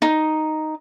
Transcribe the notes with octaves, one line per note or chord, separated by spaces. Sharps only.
D#4